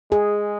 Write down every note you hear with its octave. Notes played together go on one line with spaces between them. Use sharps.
G#3 G#4